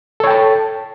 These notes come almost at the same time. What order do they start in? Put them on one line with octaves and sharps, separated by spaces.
A4 C#5 G5 A5